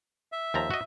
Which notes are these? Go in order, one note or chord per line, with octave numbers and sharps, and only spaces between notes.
E5
D#2 F3 A#5
F#4 D#5